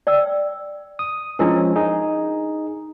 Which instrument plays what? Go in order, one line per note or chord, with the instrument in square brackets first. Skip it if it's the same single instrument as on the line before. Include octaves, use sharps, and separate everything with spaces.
[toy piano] D5 G5 E6
[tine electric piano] D#6
[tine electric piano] F3 G#3 C#4 [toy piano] D4 E4 A#4
[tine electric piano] D#4 G#4